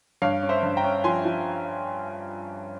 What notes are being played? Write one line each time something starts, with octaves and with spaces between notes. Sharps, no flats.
G2 C#5 F5
C#4
C5 E5
G2
G5 A#5
C#4
F3 G#5 C6
F3